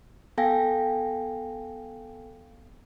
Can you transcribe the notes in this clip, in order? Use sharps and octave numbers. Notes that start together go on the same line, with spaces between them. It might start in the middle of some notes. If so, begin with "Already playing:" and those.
B3 A4 F5 G5 G#5 A#6